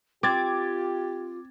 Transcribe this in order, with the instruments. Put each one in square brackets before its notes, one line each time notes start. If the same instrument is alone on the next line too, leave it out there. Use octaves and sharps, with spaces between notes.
[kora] C4 [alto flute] F4 [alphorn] G4 [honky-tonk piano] D6 G#6 A6